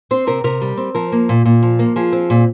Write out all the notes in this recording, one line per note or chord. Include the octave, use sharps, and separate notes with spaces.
C4 C5
C3 A#4
C3 A#4
G3
C4
F3 A#4
A#3
A#2
A#2
F3
A#3
F3 G#4
C4
A#2